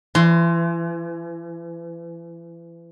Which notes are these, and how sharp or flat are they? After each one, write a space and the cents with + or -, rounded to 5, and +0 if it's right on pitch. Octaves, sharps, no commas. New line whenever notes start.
E3 +35 C6 +0